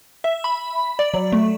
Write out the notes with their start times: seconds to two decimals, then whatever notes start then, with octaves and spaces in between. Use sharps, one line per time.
0.24 E5
0.44 B5
0.99 D5
1.14 F#3
1.32 A3